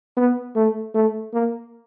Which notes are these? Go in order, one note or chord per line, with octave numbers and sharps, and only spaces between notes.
B3
A3
A3
A#3